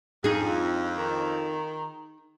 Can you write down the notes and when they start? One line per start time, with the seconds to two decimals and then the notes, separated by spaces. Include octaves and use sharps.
0.24 F2 D#4 G#4
0.98 D#3